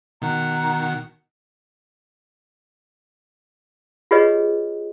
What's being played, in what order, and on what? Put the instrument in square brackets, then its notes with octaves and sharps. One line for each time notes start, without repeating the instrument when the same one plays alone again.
[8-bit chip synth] B2 D#3 F#5 [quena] A#5
[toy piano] F4 G4 G#4 B4 C#5 D#5